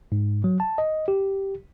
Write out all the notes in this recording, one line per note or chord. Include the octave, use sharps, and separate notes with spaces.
G#2
F#3
A5
D#5
G4